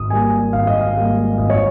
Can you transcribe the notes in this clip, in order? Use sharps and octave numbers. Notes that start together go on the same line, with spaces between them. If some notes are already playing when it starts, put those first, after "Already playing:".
Already playing: G#1 D#6
G#2 G3 A#3 G#5
G#1 F5
D#5
F5
G#2 G3 A#3 F5
G#1 D#5
C#5